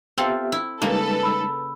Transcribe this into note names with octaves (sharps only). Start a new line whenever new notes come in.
B3 C4 F4 G4 A4 E5
E4
C#3 G3 G#3 A#3 D#4 A4 B4
B5 E6